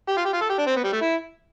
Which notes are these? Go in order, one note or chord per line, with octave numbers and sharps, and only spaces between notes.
G4
F4
G4
F4
A4
G4
D4
C4
B3
G3
A3
E4